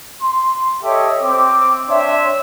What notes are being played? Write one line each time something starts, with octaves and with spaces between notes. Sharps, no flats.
C6
G4 A4 C#5 D#5 E5
C4 D6
D4 C#5 E5 G5 C6